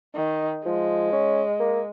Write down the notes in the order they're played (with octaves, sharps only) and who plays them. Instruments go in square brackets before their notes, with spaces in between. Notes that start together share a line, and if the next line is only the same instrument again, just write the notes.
[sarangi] D#3
[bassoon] F3 [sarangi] G#3
[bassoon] C#4
A#3